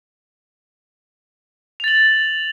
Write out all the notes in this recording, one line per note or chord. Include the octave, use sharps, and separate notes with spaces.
A6 F7 F#7